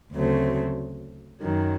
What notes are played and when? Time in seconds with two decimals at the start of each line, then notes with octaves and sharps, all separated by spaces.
0.13 D2 C#3 F#3 A3 C4
1.42 F#2 D#3 F#3